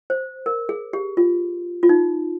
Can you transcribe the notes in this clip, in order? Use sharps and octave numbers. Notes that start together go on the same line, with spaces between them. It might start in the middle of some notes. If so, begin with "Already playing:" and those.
C5
A#4
G#4
G4
F4
F4
D#4